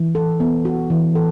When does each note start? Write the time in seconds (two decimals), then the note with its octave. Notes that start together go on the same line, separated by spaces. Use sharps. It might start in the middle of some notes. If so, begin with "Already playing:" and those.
Already playing: E3
0.15 A4
0.40 B3
0.65 F#4
0.90 E3
1.15 A4